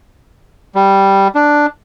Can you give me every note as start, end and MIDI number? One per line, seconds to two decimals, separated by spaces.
0.75 1.28 55
1.35 1.66 62